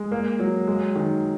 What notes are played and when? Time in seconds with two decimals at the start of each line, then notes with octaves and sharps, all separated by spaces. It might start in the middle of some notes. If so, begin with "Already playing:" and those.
Already playing: G#3
0.12 A#3
0.39 F#3
0.67 G#3
0.96 D#3